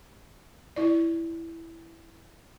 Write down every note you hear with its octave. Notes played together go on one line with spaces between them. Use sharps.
E4 D5